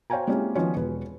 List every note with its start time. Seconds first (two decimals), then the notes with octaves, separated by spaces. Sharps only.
0.10 C5 C#5 F5 G5 G#5 A#5
0.28 G#3 A#3 C4 C#4 E4 G4
0.55 D#3 F3 B3 C#4
0.76 E1 B4